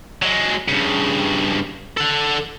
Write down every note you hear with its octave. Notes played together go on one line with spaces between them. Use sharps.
F#3 G#3
G2 C#3
A4 F#5